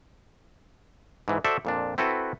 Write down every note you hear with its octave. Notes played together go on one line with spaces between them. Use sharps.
G#2 E3
F#4 A4 C5 D5 E5
F2 A#2 D4
C4 E4 F#4 A4 B4